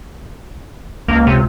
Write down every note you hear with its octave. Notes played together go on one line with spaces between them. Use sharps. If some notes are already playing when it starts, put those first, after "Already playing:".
C#2 A#3
C3